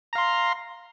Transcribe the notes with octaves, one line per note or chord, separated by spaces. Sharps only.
F5 A#5 C6